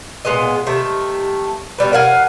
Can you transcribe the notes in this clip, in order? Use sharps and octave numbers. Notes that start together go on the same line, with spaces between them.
A#2 G#3 B3 D#5
C3 D#3 A3
B2 G3 B4
A#4 F5 F#5 G#5